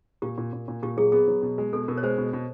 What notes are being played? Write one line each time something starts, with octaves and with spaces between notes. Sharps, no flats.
A#2 G4
A#2
A#2
A#2
A#2 G4
F#3 G#4
B3 G#4
F#3
B2
G#3
B2 A4
B2 A#4
C#5
G#3 C5
B2
B2